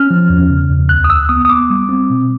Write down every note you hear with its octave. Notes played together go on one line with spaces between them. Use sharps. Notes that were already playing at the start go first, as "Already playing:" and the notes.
Already playing: C#4 F6
F3
E2
C#3
E2
D2 F#6
D#6
D2 E6
B3 D#6
D#6
B3 D6
G3
C4
B2